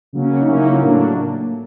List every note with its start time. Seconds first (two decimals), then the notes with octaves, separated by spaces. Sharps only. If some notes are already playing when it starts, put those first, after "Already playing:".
0.13 C#3 F#3 A#3 C#4
0.40 D#4
0.46 C#3 F#3 A#3 C#4 E4
0.55 D#4
0.63 E4
0.72 F4
0.80 A2 F#3 A#3 D4 F#4